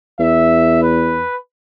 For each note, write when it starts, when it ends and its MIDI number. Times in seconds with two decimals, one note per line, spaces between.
0.19 1.24 40
0.19 0.77 76
0.83 1.36 71